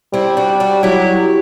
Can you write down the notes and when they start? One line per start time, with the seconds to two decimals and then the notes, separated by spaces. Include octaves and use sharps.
0.13 G3 C4 E4
0.37 D4 F#4
0.60 D4 F#4
0.83 F#3 E4 G4